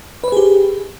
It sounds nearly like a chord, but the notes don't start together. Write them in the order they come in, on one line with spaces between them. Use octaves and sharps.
B4 C5 G#4 G4